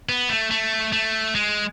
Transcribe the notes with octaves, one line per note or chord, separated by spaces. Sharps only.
B3
A3
A3
A3
G#3